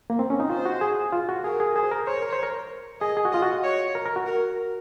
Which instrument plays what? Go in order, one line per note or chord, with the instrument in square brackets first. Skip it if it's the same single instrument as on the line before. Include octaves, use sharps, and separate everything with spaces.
[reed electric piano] A#3
C4
C#4
D#4
[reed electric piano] F4 [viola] C5
[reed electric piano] F#4
G#4
F4
F#4
[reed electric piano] G#4 [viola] A#4
[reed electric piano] G#4
[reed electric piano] G#4 [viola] C5
[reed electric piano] A#4
[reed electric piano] C5 [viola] C#5
[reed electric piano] A#4
C5
A#4
[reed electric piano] G#4 [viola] D#5
[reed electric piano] G#4
F#4
[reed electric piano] F4 [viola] D#5
[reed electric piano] F#4
[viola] C#5
[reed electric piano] A#4
A#4
F#4
[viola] A#4